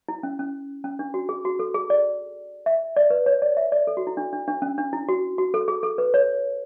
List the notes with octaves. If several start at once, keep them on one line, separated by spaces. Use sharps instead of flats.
E4
C#4
C#4
C#4
D4
F#4
G#4
F#4
A4
G#4
D5
E5
D5
B4
C#5
D5
E5
D5
A4
F#4
E4
D4
D4
D4
C#4
D4
E4
F#4
F#4
A4
G#4
A4
B4
C#5